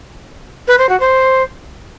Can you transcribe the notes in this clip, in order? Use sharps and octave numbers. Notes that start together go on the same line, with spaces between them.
B4
C5
F#4
C5